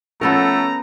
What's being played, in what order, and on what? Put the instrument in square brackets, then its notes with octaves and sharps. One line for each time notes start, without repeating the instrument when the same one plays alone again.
[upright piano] F3 C#4 [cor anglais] A3 [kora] B3 A4 A#4 [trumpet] A#5